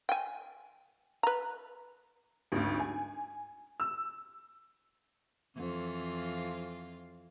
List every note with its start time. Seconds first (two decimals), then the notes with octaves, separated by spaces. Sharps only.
0.09 G5 G#5
1.23 B4 A#5
2.52 G#1 D2
2.80 G#5
3.80 E6
5.57 F2 E3 F4